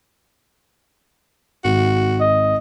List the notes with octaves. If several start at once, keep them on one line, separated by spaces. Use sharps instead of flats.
G#1 F#4
D#5